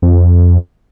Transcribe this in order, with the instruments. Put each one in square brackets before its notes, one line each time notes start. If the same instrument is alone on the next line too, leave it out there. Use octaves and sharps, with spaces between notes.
[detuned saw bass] F2